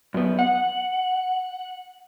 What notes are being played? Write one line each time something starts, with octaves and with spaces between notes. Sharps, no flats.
F#2 B3
F#5